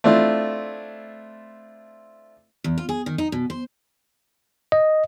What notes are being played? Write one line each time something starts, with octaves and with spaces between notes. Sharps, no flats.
A3 C4 D4 E4 F4
E2
F4
G#4
D#3
D#4
B2
C5
D#5